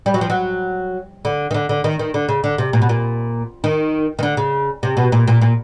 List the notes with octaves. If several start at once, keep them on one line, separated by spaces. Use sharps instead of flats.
G3
F#3
F3
F#3
D3
D#3
D3
D3
D#3
D#3
D3
C#3
D3
C3
A#2
B2
A#2
D#3
D#3
D3
C#3
C3
B2
A#2
A#2
A#2